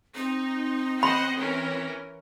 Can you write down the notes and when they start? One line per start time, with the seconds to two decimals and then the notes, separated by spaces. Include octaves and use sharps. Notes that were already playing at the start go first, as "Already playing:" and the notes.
0.16 C4 D#4
1.03 C5 D#5 F#5 B5
1.36 E3 C#4 A#4